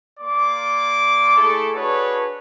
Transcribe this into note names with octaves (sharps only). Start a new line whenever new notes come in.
A#3 D5 C6 D6
A3 E4 G#4 A4
D4 F#4 G#4 A4 B4 C#5